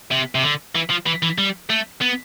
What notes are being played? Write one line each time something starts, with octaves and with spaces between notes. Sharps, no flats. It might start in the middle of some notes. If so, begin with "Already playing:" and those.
C3
C3
D3
E3
F3
E3
E3
G3
A3
B3